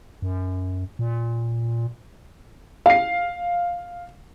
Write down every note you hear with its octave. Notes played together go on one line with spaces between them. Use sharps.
F#2
A#2
F5 C7